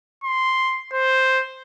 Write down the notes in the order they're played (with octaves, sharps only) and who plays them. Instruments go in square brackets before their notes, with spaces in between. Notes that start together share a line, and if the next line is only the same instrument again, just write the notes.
[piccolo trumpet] C6
C5